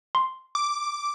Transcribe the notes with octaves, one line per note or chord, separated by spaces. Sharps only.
C6
D6